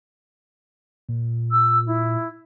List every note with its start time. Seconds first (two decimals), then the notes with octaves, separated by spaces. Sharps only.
1.09 A#2
1.51 E6
1.87 E4